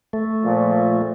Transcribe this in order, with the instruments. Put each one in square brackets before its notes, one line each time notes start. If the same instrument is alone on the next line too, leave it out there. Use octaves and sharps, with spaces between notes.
[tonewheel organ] A3
[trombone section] A#2 F3